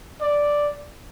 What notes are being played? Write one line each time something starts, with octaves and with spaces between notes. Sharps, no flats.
D5